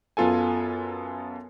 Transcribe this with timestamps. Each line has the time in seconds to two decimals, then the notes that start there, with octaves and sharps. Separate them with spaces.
0.17 F#2 B3 F4 A4 G#5